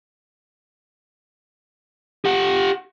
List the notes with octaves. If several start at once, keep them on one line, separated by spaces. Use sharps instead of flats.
G4 F#5